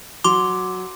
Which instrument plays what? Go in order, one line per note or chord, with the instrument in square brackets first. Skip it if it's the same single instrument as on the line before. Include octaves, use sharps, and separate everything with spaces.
[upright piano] F#3 [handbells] C6 D6